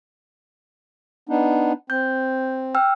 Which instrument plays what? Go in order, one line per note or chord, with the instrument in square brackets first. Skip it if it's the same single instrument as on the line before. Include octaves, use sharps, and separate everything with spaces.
[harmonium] B3 D4 D#4
[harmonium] C4 [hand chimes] G6
[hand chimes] G5 E6 F6